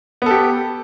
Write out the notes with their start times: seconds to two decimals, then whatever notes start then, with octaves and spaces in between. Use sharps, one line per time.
0.22 B3
0.26 A4
0.31 G4